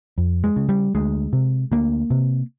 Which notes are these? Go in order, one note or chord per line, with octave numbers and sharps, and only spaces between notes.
F2
G#3
C#3
G3
D2 G#3
C3
D2 A#3
C3